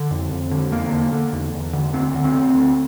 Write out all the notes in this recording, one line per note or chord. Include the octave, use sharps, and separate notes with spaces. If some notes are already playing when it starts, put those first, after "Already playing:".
Already playing: D3
F2
F2
D3
E2 A#3
D3
D3
E2
E2
D3
D2 C4
D3
C4
D3
D2